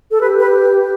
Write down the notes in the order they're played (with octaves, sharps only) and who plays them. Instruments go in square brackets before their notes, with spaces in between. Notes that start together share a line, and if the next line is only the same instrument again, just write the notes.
[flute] A4
[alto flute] G4 [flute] B4
[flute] B4